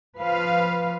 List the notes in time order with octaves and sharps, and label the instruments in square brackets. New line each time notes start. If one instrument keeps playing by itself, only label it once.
[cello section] F3 B4 F5